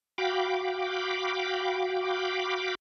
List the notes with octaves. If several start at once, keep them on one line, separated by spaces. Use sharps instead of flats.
F#4 F5 G5 B5 D6